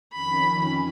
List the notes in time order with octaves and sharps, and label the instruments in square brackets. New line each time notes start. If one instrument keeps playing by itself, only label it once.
[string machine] F2 D#3 C#4 [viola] B5